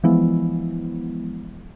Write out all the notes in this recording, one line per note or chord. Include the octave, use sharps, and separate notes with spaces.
E3 F3 G#3 B3 E4